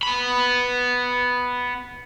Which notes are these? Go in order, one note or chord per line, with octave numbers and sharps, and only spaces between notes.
B3 B5